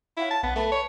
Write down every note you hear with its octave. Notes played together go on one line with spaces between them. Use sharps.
E4 C#5 F5 F#5
A5
B1 B3
A3 B4 A5 B5
C#5